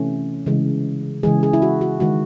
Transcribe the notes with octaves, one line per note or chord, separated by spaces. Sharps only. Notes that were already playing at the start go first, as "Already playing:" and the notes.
Already playing: C3 E3 A3 C#4
C#3 E3 G#3
C#3 E3 G#3 G#4
G#4
E4
F#4
F#4
D#3 G#3 F#4